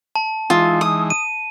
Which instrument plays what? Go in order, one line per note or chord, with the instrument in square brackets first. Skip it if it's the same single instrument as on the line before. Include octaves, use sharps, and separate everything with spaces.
[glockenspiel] A5
[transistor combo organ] E3 G#3 D#4 [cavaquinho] F4
[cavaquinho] D#6
[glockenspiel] D#7